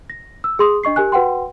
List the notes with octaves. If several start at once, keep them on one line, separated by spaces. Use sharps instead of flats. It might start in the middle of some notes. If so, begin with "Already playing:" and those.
A#6
E6
G#4 C6 D#6
D4 D#5 C#6 C7
G4 A#4 G#5 F#6
F#4 B4 F#5 G5 C6